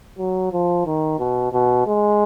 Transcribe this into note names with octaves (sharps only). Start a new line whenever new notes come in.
F#3
F3
D#3
B2
B2
G#3